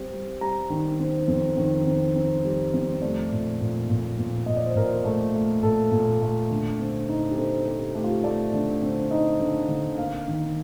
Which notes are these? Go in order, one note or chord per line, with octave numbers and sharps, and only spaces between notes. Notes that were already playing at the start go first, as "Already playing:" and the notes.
Already playing: G3 C4
G3
G3 A#5
D#3
C4
F2
D#3
C4
C4
G3
F2
A3 D5
A#2
A#2
A#2
A#2
A#2 D#5
D5
C5
A#2 A#4
A3
A3
A#2 A4
A#2
A3
D3
C4
D#4
G4
C4 A4
C4 G4
A3 G4
F4
G4
A3 D5
D3
C4
D#4 D#5
D3
D3
A#3 F5
D#3